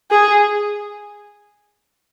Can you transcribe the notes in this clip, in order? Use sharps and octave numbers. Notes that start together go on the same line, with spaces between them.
G#4